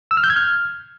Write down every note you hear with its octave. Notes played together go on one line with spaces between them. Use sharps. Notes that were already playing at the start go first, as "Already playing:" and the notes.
E6
F6
G6
G#6
F6